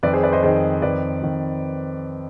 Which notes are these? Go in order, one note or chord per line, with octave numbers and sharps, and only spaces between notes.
F2 D#3 B4 D5
G#4 C5
B4 D5
C5 D#5
F2 D#3 G#4 C5
F2 D#3 B4 D5
F2 D#3